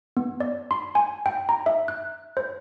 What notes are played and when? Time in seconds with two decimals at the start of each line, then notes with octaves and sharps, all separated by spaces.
0.17 B3
0.40 D5
0.71 C6
0.95 G#5
1.26 G5
1.49 A#5
1.66 E5
1.88 F#6
2.37 C5